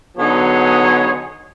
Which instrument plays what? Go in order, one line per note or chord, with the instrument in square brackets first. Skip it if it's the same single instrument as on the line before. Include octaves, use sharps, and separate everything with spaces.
[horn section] D3 F#3 B3 D#4 G#4 C#5